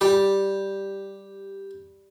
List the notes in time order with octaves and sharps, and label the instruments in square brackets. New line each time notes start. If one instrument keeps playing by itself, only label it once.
[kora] G3 [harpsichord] G4